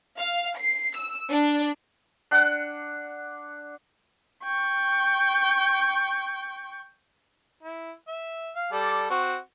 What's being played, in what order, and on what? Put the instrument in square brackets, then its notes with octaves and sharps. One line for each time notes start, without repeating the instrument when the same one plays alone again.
[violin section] F5
C7
E6
D4
[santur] D4 F#5
[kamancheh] G5 C#6
[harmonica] E4
E5
F5
G3 A4 D5
C4 F#4